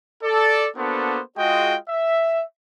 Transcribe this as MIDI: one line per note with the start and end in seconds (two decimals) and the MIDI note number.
0.23 0.66 69
0.23 0.66 74
0.77 1.19 58
0.77 1.19 59
0.77 1.19 62
0.77 1.19 66
0.77 1.19 69
0.77 1.19 72
1.37 1.76 56
1.37 1.76 65
1.37 1.76 66
1.37 1.76 68
1.37 1.76 75
1.37 1.76 79
1.89 2.42 76